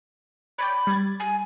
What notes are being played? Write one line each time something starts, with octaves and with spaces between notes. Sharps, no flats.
C#5 D5 G5 B5
G3 G#6 A6
G#5